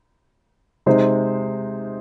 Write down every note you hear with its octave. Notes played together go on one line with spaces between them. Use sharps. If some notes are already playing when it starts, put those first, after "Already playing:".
C3 G#3 D#4 C5